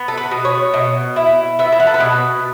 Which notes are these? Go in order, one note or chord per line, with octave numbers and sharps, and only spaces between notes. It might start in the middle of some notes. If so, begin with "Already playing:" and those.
Already playing: B3
A4
B4
B2
C#5
B2
E4
B3 E5
E4
F#4
A4
B4
B2 C#5